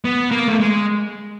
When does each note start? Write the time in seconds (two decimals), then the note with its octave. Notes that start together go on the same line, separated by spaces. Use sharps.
0.05 B3
0.31 A#3
0.48 A3
0.60 G#3